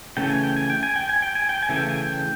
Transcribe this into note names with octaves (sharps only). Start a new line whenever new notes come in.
C#3 E3 A3 C#4 G5
G#5
G5
G#5
G5
G#5
G5
G#5
G5
G#5
G5
G#5
C#3 E3 A3
G5
G#5
G5